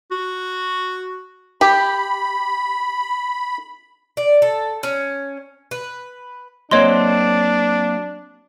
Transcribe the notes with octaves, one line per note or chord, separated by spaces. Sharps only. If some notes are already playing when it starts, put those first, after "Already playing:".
F#4
G4 B5
D5
A4
C#4
B4
F#3 A#3 C4 D4 C#5 D#5 C6